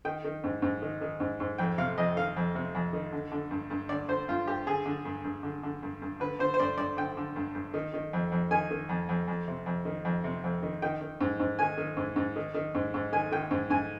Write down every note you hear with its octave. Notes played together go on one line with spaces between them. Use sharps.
D#3 G5
D#3
G#2
G#2
D#3
D#3
G#2
G#2
F2 G5
C3 F5
F2 D#5
D#3 F5
F2
C3
F2
D#3
D3
D3
G2
G2
D3 D5
D3 C5
G2 F4
G2 G4
D3 G#4
D3
G2
G2
D3
D3
G2
G2
D3 B4
D3 C5
C5
G2 D5
G2 D5
D3 G5
D3
G2
G2
D#3
D#3
F2
F2
D#3 G#5
D#3
F2
F2
F2
C3
F2
D#3
F2
C3
F2
D#3
D#3 G5
D#3
G#2
G#2
D#3 G#5
D#3
G#2
G#2
D#3
D#3
G#2
G#2
D#3 G#5
D#3 G5
G#2
G#2 G#5